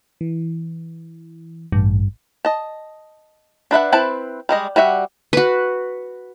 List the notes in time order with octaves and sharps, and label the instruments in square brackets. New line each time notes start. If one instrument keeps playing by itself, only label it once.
[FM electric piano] E3
[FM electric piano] A1 [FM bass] G2
[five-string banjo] D#5 A5
D4 B4 E5 F#5
C4 E4 B4 A5
G3 G#3 D#5
G3 F#4 E5 F#5
[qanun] F#4 B4